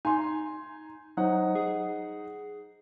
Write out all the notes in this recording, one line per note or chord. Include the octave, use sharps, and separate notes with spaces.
D#4 G#5 C6
F#3 D#4 C5 F#5
G#4